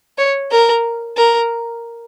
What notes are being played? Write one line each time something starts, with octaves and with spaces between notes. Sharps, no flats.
C#5
A#4
A#4